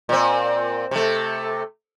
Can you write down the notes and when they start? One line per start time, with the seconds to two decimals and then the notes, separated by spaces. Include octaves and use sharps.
0.09 A#2 C4
0.91 C3 A3